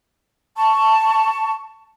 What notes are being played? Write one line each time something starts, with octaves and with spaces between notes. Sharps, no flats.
A5 C#6